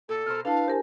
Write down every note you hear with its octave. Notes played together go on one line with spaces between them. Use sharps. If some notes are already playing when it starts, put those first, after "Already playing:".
A#2 A4
B2 A#4 C5 F6
D4 E4 A4 B4 F5
G4 A#4 C5 G#5